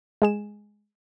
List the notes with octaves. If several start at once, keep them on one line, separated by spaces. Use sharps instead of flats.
G#3 G#4 E7